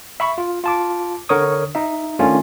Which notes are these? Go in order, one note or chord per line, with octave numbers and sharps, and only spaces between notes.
E5 B5 C#6
F4
F4 A5 D6
D3 A#4 C#5 C#6 D#6
D#4 E5
D#3 A3 C#4 D4 F4